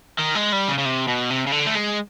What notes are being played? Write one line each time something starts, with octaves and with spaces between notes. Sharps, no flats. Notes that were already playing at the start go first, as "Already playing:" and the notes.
D#3
G#3
G3
C#3
C#3
C3
B2
C3
C#3
D3
A3
G#3